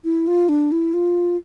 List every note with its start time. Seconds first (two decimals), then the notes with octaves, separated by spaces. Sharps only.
0.04 E4
0.27 F4
0.49 D4
0.72 E4
0.94 F4